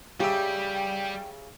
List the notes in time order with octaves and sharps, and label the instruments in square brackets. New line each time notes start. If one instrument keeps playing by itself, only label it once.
[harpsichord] C#3 E5 [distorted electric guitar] G3 [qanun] G4 [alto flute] G5